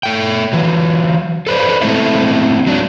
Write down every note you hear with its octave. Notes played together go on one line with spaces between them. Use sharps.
A3 G5
E3 F#3
A4 B4 C5 D5
G#3 A3 C4 E4 A4 E5
F#3 D4